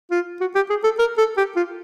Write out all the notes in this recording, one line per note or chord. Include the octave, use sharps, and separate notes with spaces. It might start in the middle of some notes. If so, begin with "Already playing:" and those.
F4
F#4
G4
G#4
A4
A#4
A4
G4
F4